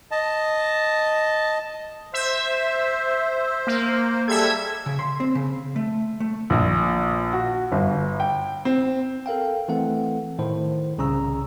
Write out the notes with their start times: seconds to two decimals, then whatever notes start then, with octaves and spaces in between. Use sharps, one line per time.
0.11 D#5 A5
2.14 C5 E5
3.67 A#3
4.28 G3 G#3 A4 E5 G#6
4.86 C#3
4.99 C6
5.20 C4
5.35 C#3
5.76 A3
6.20 A3
6.50 A#1
7.33 F#4
7.72 G1
8.20 G5
8.65 C4
9.26 A4 A#4 F5 G5
9.68 E3 A3 C4 A4 F#5
10.39 A2 D#3 C5
10.98 C2 C#3 C#4 A#5 E6